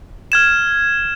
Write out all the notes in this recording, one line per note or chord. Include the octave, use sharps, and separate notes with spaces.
F6 G#6 E7